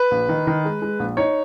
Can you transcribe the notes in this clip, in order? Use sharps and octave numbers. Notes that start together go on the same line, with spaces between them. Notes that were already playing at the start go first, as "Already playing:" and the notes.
Already playing: B4
A#1
D#3
D#3
G#3
G#3
A#1
D#4 C#5